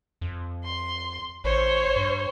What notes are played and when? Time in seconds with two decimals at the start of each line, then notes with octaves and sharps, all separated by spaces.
0.21 F2
0.64 C6
1.44 A1 C5 C#5
1.96 G2